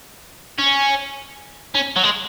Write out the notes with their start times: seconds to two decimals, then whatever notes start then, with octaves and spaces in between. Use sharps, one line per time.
0.59 C#4
1.75 C#4
1.96 F#3
2.03 G#3